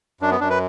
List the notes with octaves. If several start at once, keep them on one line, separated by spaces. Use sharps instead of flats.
F#2 D4
B3
F#2 D4
B4